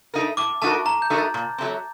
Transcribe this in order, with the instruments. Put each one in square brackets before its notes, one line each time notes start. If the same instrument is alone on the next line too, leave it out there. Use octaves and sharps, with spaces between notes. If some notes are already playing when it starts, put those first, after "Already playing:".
[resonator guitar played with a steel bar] A3 D#4 F#4 A#4
[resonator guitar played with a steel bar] A2 [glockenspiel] D6
[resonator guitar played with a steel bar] A3 D#4 F#4 A#4 [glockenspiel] A5
[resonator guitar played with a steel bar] A2 [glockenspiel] A#5
[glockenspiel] G6
[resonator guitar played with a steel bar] A3 D#4 F#4 A#4
[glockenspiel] A6
[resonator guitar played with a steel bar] A#2
F#3 A3 C4